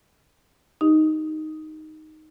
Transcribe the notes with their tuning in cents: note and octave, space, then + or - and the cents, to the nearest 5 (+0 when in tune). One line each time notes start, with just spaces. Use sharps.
D#4 +0 G4 +10 D#5 +0